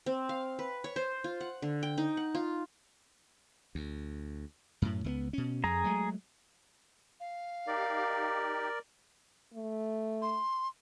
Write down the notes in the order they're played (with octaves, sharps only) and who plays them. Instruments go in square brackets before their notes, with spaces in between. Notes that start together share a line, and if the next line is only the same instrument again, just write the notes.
[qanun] C4
F5
B4
C#5
C5
F4
F#5
D3
G5
D#4
F#5
F4
[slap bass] D2
F#2 A2
C#2 A3 B3
B2 C#4
[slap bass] F2 [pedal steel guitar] G#4 A#5
[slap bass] F#3 G#3 A3
[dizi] F5
[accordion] D#4 G4 [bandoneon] A#4 D5
[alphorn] A3
[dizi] C6